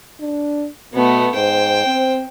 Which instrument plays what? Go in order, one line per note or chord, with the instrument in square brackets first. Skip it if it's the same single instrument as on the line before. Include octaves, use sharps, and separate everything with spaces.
[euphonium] D4
[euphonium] B2 [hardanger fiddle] A3 B3
[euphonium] G#2 [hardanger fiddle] C5 G5
[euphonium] C4